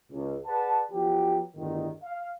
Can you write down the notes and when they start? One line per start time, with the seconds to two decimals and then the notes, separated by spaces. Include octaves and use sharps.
0.12 C#2
0.47 G#4 B4 D5 F#5 A5
0.92 F3 F#3 B3 G4
1.56 G1 E2 A2 D3 D#3
2.03 F5